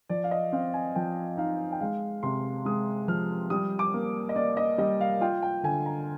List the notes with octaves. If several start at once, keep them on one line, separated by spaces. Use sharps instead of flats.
F3 D5
F5
D#5
C4 F5
G#5
F3 G5
D#4 F5
G5
G#3 F5
C3 C6
G#3 D#6
F3 F6
G3 D#6
D6
A#3
D#5
A#3 D5
D#5
G3 D#5
F5
F4 G5
G5
D3 G#5
A#5